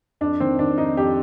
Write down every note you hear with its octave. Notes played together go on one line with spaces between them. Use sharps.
F2 D4
D#3 C4
D#3 D4
F2 D#4
F2 G4